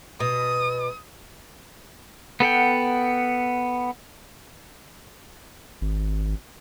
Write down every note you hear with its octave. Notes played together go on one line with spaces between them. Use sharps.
B2 D#6
B3 A4 F#5 G5
G#1